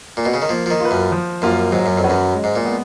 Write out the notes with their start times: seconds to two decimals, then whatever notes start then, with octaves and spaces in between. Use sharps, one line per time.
0.17 A#2
0.25 B2
0.34 C#3
0.42 D#3
0.49 F3 A#3
0.66 F3
0.70 D#3
0.80 F4 B4
0.91 F#2
1.12 F3
1.42 F#2 A#3 F4
1.72 G#2 F#3
1.86 F#2
1.97 F2
2.04 C#4 F#4 B4
2.10 F#2
2.34 G#3
2.44 G#2
2.55 A#2
2.65 B3